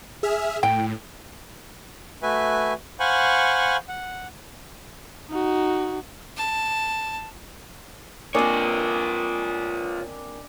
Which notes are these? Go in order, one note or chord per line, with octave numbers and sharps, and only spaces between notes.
G#4 E5 F6
A2 G5
A3 F#4 B4 E5 G#5
C5 F5 F#5 G#5 B5 C#6
F#5
D#4 F#4
A5
A#3 C4 D4 F4 C#5 D#5 G#5